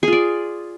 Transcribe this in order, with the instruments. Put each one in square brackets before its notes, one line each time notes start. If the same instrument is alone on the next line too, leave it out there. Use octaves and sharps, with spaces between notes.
[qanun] G#4
F4
D5